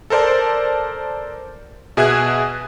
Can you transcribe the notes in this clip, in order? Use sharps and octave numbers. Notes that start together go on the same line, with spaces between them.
A4 A#4 C5 D5 A5
B2 G#4 E5 D#6 F#6 G#6